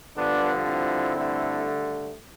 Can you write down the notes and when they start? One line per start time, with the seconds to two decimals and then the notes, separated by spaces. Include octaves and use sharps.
0.17 G2 D3 F3 B3 D4
0.66 C4 E4
1.15 G2 D3 A3